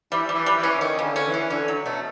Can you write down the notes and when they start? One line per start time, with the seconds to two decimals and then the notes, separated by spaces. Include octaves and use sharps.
0.12 E3 G3
0.29 G3
0.34 E3
0.46 G3
0.58 E3
0.63 C#4
0.78 D3
0.81 D#3 C#4
0.99 C#3
1.04 D3
1.16 C#4
1.28 E3
1.34 C#4
1.50 D3 C#4
1.68 F#3
1.86 B2 A3